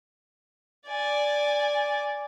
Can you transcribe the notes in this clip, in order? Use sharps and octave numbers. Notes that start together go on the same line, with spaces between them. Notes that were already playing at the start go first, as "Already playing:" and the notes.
D5 G#5